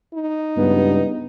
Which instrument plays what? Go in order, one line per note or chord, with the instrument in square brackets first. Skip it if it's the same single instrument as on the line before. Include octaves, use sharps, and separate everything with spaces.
[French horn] D#4
[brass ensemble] C#2 G2 [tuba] B3